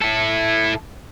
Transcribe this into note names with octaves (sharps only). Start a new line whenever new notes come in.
E4 A4